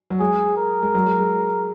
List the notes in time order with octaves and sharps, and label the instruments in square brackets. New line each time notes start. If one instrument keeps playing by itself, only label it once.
[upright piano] F#3
[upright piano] G#3 [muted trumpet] G#4
[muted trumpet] A#4
[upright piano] G#3
F#3
G#3
G#3